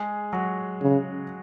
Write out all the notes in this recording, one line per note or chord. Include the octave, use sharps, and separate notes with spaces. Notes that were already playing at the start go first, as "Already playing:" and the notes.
Already playing: G#3 G#4
F#3 F#4
C#3